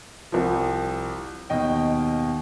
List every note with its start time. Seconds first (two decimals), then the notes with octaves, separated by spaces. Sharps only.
0.32 C2 F3
1.50 D#2 B2 D#5 G5